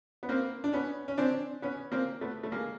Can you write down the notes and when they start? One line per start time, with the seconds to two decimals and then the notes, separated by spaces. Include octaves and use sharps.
0.23 B3
0.29 A#3 C4
0.64 D4
0.73 B3 C#4
1.08 C#4
1.18 C4 D4
1.62 B3 C#4
1.92 A#3 C4
2.21 A3 B3
2.43 A3
2.52 G#3 A#3